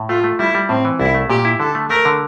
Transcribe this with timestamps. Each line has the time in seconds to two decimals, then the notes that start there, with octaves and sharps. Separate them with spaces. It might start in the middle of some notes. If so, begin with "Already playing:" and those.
Already playing: A2
0.09 A3 F4
0.24 A3
0.39 G3 E4
0.55 G3
0.69 A2 C4
0.85 E3
1.00 C2 E4
1.15 A3
1.30 A#2 G4
1.45 E4
1.60 D3 A4
1.75 A3
1.90 A3 A#4
2.05 D3